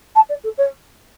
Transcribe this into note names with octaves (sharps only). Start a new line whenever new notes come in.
A5
D5
A4
C#5